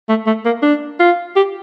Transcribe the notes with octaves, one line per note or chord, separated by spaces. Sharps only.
A3
A3
A#3
D4
F4
G4